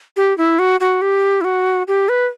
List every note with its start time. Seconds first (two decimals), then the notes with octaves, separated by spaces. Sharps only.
0.17 G4
0.38 E4
0.59 F#4
0.80 F#4
1.02 G4
1.41 E4
1.44 F#4
1.88 G4
2.09 B4